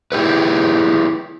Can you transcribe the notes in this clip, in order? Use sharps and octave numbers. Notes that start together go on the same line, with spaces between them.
E4 G4 G#4 B4